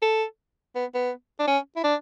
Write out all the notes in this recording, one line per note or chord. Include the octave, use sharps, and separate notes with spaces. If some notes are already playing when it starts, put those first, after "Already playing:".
A4
B3
B3
D4
C#4
E4
D4